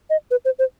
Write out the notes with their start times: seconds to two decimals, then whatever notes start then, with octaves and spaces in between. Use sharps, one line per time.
0.10 D#5
0.31 B4
0.45 C5
0.59 C5